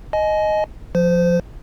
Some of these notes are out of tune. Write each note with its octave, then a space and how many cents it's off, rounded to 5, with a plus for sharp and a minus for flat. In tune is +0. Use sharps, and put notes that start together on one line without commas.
D#5 +0 G#5 +35
F3 +20 C5 -25